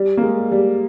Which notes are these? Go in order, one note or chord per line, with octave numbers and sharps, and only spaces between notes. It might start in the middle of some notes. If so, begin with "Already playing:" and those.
Already playing: G3
A#3
G#3
G3